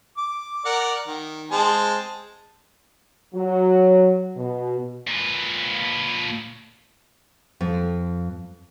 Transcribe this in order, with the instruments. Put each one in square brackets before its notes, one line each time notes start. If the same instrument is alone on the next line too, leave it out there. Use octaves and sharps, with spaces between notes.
[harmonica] D6
A#4 D5 F#5
D#3
G#3 C4 A5
[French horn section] F#3
B2
[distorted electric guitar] A#2 B4
[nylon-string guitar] F2